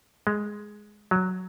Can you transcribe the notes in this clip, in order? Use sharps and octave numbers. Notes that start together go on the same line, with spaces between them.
G#3
F#3